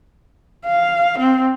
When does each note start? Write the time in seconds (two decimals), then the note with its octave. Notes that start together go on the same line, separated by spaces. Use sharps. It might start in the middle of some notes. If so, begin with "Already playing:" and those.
0.66 F5
1.19 C4